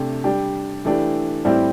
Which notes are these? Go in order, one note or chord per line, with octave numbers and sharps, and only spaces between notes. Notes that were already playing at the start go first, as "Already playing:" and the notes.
Already playing: C3 A3 D4 G4
G3 D4 G4
E3 A3 D4 G4
A2 G3 C4 E4 G4